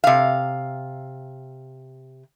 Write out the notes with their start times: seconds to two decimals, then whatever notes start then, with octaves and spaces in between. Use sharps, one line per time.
0.04 C3 F5